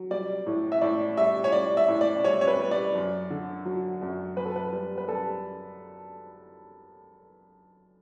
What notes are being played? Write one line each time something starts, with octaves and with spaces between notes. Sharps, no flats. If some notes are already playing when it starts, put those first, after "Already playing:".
Already playing: F#3
G3 D5
A2
E5
A2 D5
G3 E5
C#5
G3 D5
E5
A2
D5
G3 C#5
C#5
B4
G3
D5
F#2
D3
F#3
F#2
F#2 B4
A4
B4
G3
B4
G3 A4